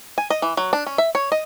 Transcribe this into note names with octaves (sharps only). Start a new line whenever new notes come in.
G#5
D#5
E3
F#3
D4
C#4
E5
C#5
D#5